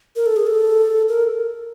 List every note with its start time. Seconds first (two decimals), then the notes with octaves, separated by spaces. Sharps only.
0.16 A#4
0.26 A4
0.36 G#4
0.47 A4
1.09 A#4